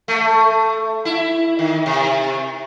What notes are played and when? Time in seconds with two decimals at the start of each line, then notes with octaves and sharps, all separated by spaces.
0.08 A3
1.05 E4
1.59 D#3
1.86 C3